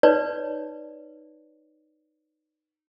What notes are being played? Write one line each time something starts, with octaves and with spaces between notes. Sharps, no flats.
D#4 B4 C#5 D5